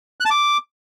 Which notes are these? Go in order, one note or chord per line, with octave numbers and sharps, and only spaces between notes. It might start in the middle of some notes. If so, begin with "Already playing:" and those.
F#6
A5
D6